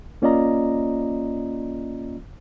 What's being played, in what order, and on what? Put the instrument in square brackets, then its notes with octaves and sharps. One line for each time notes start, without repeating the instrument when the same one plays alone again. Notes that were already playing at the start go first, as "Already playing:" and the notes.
[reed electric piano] A#3 C#4 F4 D5 D#5 A#5